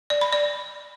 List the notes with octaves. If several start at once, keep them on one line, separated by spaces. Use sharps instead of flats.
D5
B5
D5